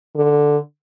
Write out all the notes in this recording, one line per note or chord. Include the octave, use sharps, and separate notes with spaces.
D3